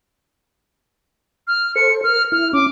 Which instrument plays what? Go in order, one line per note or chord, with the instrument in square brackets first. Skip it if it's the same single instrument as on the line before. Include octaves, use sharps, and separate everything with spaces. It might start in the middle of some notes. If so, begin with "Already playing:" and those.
[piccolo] F6
[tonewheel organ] A4 C5 [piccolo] C#7
[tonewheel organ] A#4 [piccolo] F6
[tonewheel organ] E4 [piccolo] F6
[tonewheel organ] C#4 [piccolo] D6